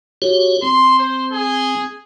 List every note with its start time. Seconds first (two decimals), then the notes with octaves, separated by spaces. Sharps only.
0.22 F#4 G4 C#5
0.62 C4 C6
0.99 C5
1.32 G#4